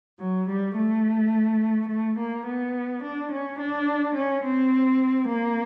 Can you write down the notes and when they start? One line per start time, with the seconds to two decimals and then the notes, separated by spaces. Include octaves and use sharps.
0.20 F#3
0.48 G3
0.77 A3
1.89 A3
2.17 A#3
2.46 B3
3.02 D4
3.31 C#4
3.58 D4
4.15 C#4
4.43 C4
5.28 A#3